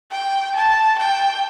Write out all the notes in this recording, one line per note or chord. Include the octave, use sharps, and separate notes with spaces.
G5
A5
G5